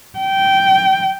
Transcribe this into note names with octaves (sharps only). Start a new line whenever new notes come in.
G5